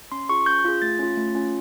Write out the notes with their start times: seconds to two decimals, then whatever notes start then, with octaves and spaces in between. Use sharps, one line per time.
0.12 C#4 C6
0.29 F4 G#4 C#6
0.46 C#4 G6
0.65 F4 G#4
0.82 A3 A6
0.99 C#4 F4
1.17 A3
1.35 C#4 F4